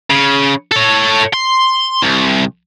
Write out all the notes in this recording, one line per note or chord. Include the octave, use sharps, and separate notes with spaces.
C#3
A4 C#5
C6
C2